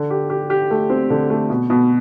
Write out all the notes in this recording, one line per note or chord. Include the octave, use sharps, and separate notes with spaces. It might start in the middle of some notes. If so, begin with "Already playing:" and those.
Already playing: D3
G4
G4
G4
A3
C4
D3
A3
B2
B2